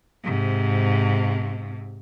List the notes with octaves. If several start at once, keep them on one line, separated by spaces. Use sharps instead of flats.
G#2 C3